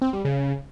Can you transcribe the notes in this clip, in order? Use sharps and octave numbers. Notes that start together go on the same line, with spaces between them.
C4
G3
C#3